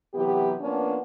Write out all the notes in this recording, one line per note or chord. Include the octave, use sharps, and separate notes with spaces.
C3 E3 F#3 B3 G4
F3 A#3 B3 C#4 D4